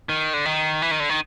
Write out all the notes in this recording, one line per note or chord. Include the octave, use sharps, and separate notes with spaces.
D#3
D3
D#3
E3
D#3
D3
D#3